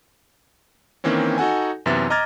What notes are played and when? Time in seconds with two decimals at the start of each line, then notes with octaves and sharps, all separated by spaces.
1.04 D#3 E3 A#3 C4 C#4
1.38 D#4 F#4 A4 F#5 G#5
1.86 F#2 C3 E3 B3 E5 A6
2.10 D#5 A#5 D6 F6 G#6 A6